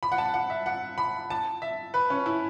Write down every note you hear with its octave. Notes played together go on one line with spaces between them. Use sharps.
B5
F#5
A5
F#5
E5
F#5
B5
A5
E5
B4
C#4
E4